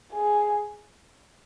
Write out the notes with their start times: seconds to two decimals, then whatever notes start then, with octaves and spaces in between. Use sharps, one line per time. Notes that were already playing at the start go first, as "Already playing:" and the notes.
0.12 G#4